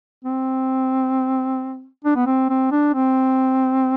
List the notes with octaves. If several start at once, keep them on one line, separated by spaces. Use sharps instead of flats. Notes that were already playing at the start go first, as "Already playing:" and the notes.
C4
D4
B3
C4
C4
D4
C4